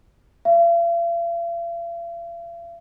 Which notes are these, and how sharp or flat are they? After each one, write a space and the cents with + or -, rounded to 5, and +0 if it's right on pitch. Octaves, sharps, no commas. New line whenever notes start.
F5 -45